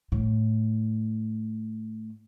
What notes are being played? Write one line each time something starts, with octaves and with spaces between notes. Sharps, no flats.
A2